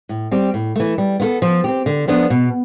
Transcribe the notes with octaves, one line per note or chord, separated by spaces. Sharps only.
A2
G3 C4 G4
A2
E3 A3
G3
B3 F4 A4
F3
C4 G4
D3
F3 B3 D4
B2